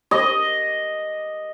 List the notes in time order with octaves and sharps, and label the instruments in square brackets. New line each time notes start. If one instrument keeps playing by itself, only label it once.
[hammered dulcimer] D#5